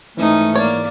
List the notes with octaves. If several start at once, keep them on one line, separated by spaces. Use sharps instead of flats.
G#2 E3 A3 C#4 D#4
A#3 C#5 D5